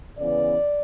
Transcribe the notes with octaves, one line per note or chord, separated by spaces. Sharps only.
C#3 E3 B3 D5